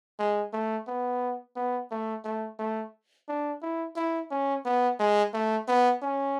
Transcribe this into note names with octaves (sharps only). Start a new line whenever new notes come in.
G#3
A3
B3
B3
A3
A3
A3
D4
E4
E4
C#4
B3
G#3
A3
B3
C#4